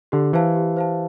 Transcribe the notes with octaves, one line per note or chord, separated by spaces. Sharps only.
D3 G4
E3 C5 F5 A5
G4
C5 F5 A5